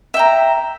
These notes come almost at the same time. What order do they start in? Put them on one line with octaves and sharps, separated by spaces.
E5 G5 A#5